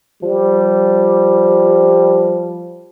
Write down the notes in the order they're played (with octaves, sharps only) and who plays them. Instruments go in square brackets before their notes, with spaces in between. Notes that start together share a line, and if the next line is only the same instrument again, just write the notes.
[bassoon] F3 [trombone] G3